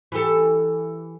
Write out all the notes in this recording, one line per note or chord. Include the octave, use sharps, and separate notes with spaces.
E3 G4 A4